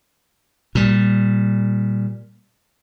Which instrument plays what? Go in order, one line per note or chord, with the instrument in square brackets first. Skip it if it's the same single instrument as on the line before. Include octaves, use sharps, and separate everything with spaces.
[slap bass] A#2 G3